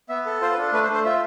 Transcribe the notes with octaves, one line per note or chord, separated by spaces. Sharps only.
B3 E5
A4
F4 C5
B4
D4 A4
A3 B4
C5
A3
C5
F4 E5